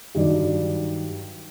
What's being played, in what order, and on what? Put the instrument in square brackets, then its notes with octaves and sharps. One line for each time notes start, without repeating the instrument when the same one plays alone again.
[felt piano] G2 D#3 F#3 D#4 D5